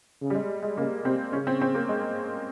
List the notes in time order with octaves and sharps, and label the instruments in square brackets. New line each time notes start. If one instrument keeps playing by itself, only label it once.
[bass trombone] C#3
[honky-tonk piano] G3
G#3
G#3
[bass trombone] C#3 [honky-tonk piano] A#3
[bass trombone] C3 [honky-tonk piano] C4
[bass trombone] C#3 [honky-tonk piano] C#4
[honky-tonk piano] C4
C4
A#3
G#3